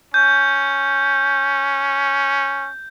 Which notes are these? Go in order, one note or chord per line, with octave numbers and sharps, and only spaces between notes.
C#4 G6